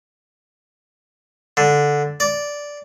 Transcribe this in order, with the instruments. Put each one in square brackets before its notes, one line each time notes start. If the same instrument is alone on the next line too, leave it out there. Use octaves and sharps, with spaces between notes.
[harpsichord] D3
D5